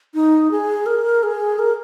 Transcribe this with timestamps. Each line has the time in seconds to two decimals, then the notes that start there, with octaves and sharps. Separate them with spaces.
0.14 D#4
0.51 G#4
0.86 A#4
1.23 G#4
1.59 A#4